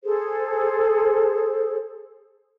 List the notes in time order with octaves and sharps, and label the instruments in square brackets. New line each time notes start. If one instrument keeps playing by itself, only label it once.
[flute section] G#4 A4 C5